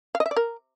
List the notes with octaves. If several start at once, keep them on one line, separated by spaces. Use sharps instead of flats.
F5
D#5
E5
D5
A#4